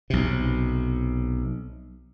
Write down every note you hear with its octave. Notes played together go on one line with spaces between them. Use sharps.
B1 C3